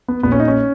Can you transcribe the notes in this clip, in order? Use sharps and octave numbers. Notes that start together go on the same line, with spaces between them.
B3
A#1 A#2 B3
C#4
D#4
C#4